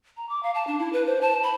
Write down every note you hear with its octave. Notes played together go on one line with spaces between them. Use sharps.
A#5
D6
F5
A5
D4
E4
B4
C5
A5
B5